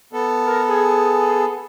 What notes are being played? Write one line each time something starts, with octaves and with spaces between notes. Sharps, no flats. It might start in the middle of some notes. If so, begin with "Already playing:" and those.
B3 A4
A#4
G#4